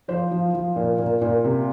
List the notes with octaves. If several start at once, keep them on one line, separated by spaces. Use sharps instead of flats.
F3 C5
F3
F3
A#2
A#2
A#2
C3